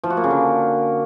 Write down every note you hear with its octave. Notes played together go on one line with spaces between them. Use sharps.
F3
F#4
A#3
C#3
D3